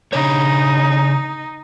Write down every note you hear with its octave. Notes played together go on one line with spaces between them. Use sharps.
C#3 D4 D#4 C#5